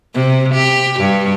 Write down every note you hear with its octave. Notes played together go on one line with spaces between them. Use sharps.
C3
G4
G2